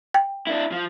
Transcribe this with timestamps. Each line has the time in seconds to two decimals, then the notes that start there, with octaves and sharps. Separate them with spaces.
0.14 G5
0.47 D4 E4
0.72 F3